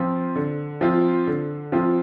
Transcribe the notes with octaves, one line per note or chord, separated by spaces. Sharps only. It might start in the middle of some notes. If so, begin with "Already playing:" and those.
Already playing: F3 C4 F4
D3
F3 C4 F4
D3
F3 C4 F4